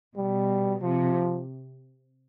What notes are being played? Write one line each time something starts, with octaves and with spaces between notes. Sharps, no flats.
B2 G3
C3 F3